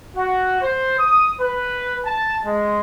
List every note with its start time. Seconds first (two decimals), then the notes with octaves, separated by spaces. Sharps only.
0.16 F#4
0.62 C5
0.99 D#6
1.40 B4
2.06 A5
2.44 G#3